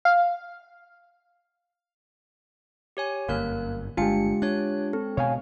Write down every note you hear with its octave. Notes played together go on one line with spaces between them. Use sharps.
F5
G4 C#5 G#5
G1 F#2 A#3 A#4 F#6
G1 G#3 D4 F4 G4 C#7
D4 C#5 F#6
C4 A4
B2 C#5 F5 G#5